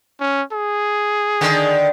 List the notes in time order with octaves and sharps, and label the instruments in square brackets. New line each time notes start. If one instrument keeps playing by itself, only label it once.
[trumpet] C#4
G#4
[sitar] D3 D#3